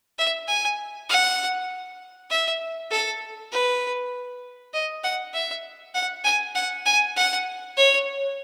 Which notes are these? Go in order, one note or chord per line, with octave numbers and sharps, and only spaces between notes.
E5
G#5
F#5
E5
A4
B4
D#5
F#5
E5
F#5
G#5
F#5
G#5
F#5
C#5